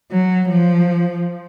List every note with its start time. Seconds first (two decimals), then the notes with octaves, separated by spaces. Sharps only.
0.11 F#3
0.49 F3